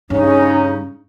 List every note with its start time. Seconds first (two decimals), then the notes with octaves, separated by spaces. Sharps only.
0.10 G2 C#3 C#4 D#4